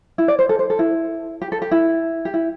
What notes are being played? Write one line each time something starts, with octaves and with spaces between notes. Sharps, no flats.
E4
D5
C5
A4
C5
A4
E4
G4
A4
G4
E4
G4
E4